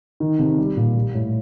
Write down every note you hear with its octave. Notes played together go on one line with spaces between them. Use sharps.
D#3
C3
G3
A#2
G3
A2